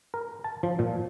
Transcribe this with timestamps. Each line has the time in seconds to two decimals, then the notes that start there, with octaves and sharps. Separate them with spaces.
0.14 A#4
0.44 A5
0.63 F3
0.79 A#2